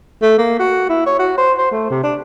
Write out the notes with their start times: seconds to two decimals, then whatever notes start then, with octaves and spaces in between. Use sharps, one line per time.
0.22 A3
0.38 A#3
0.59 F#4
0.89 E4
1.06 C#5
1.19 F#4
1.37 C5
1.58 C5
1.71 A3
1.91 C3
2.03 D4